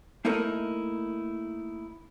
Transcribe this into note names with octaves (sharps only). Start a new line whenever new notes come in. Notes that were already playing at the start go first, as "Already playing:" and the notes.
A3 A#3 D#4 E4 A4 A#4